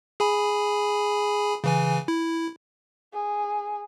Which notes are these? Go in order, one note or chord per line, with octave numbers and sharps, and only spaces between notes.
G#4 G#5 B5
C#3 E3 G#5
E4
G#4